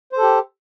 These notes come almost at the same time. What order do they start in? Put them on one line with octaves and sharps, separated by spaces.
C5 A4 G4